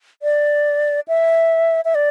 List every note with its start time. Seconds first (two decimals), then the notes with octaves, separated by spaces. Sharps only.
0.22 D5
1.08 E5
1.85 E5
1.95 D5